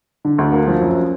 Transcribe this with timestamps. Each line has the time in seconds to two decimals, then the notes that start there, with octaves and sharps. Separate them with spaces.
0.25 D3
0.38 D2
0.52 A#3
0.67 F3
0.81 F#2